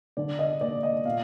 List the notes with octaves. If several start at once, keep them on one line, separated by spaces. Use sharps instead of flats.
D3 D5
D#5
A#3 D5
D#5
A#2 F5